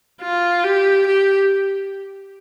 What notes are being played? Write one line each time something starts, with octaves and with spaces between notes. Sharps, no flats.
F4
G4
G4